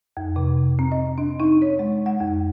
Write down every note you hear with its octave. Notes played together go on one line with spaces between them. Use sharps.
F2
C3
C4
D#5
D4
D#4
C#5
G#3
F#5
F2